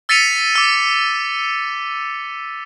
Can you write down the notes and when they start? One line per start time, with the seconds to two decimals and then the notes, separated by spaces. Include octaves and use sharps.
0.09 E6 A6 B6 C#7 D#7 F7
0.55 D6 E6